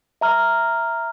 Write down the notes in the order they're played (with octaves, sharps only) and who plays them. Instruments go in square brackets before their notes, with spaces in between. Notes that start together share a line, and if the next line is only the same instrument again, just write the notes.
[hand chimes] E5 A#5 F6